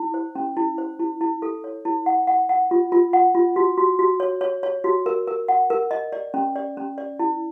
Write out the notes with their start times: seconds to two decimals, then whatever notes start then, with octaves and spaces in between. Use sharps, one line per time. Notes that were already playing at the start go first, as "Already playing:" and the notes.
Already playing: E4
0.14 C5
0.35 C#4
0.57 E4
0.78 C5
0.99 E4
1.21 E4
1.42 A4
1.64 C#5
1.85 E4
2.06 F#5
2.27 F#5
2.49 F#5
2.71 F4
2.92 F4
3.13 F#5
3.35 F4
3.56 F#4
3.78 F#4
3.99 F#4
4.20 C#5
4.41 C#5
4.63 C#5
4.84 F#4
5.06 A#4
5.27 A#4
5.48 F#5
5.70 A#4
5.91 D#5
6.12 D5
6.34 C#4
6.56 D5
6.77 C#4
6.98 D5
7.19 E4